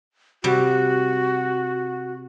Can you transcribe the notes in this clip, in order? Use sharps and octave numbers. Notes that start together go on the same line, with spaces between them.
C3 G3 F#4